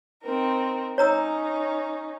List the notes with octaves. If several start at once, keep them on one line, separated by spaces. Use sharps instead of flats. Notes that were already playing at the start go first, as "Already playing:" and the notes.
C4 D#4 A#4
C#4 D#4 C#5 A#5 E6